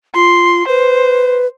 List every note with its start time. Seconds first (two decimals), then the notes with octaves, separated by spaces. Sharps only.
0.15 F4 C6
0.68 B4 C5